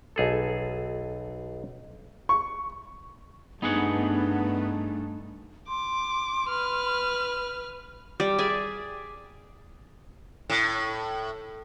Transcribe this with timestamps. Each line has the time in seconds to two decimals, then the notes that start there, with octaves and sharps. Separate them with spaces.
0.16 B1 G#4 A4
2.29 C#6
3.62 G2 A3 B3 D4 D#4 G#4 F#5
5.68 C6 D6
6.49 B4 F6
8.20 G3
8.39 G#4 D5 E5
10.50 A2